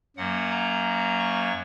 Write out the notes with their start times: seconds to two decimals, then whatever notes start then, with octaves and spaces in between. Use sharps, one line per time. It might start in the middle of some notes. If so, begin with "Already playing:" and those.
0.17 F#2 F#3 A#3 F#5
0.51 A#5
1.19 C#6